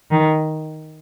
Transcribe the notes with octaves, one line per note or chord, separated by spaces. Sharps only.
D#3